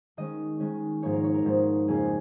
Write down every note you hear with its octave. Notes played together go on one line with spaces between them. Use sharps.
D#3 G#3 C#4 D#5
D#3 G#3 C#4
G#2 F3 A#3 D#4 C#5
A#4
C#5
A#4
G#2 F3 A#3 D#4
F2 C#3 A#3 C#4 G#4